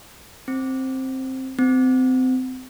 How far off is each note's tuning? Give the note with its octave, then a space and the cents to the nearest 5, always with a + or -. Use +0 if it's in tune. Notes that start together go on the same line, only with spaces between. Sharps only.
C4 +10
C4 -30